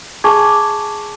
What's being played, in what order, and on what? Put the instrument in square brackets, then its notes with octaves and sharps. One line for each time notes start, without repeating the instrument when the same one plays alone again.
[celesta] G#4 G#5 A5 C#6 D6 G#6